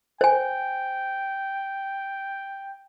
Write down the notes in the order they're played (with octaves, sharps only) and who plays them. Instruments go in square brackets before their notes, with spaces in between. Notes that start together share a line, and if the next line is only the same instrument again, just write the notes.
[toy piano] C5 G#5 [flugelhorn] G5